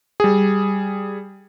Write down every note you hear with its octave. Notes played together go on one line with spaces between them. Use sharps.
G3 G#4